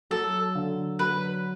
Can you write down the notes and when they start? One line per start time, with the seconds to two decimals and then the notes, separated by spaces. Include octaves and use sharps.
0.11 F#3 A4
0.55 D3
0.99 F#3 B4